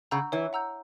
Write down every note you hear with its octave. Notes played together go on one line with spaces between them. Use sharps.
C#3 F#5 A#5 E6 G6
E3 C#5
F#5 A#5 E6 G6